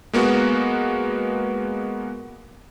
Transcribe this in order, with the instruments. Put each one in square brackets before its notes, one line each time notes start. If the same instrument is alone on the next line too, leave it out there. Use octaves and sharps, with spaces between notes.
[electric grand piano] G#3 A#3 B3 F#4